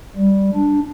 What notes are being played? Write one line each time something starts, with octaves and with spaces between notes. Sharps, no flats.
G3
D4